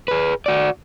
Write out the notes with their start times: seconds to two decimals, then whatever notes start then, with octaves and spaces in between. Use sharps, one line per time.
0.08 G#4 B4
0.46 F#4 D5